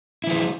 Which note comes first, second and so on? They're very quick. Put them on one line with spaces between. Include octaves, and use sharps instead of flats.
E4 F3 G#3